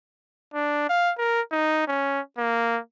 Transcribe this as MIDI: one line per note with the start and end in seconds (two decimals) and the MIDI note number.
0.54 0.86 62
0.89 1.12 77
1.18 1.41 70
1.52 1.83 63
1.88 2.20 61
2.38 2.79 58